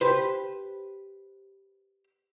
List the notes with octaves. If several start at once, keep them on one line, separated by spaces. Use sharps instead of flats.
G4 B4 C5